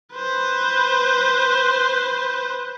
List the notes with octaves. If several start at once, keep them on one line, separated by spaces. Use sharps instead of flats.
B4 C5